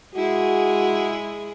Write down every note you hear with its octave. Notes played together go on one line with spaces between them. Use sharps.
G#3 E4 F#4 G#4